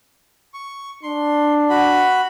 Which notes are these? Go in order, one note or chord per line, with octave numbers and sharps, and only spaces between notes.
C#6
D4 C6
F#4 B5